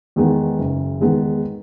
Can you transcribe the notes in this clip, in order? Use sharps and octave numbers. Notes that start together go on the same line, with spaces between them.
E2 D#3 G#3 B3
F#1
E2 D#3 G#3 B3